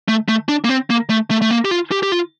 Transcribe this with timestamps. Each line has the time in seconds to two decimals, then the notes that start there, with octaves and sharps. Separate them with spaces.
0.08 A3
0.28 A3
0.49 D4
0.65 A#3
0.69 C4
0.90 A#3
1.10 A3
1.31 A3
1.42 A3
1.51 A#3
1.65 G4
1.71 F4
1.92 G4
2.03 G4
2.12 F4